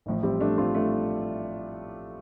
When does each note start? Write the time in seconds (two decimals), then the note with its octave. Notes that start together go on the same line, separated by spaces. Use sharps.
0.06 A1 A2 F3
0.23 G3 C4
0.41 A3 D4
0.58 C4 F4
0.74 A3 D4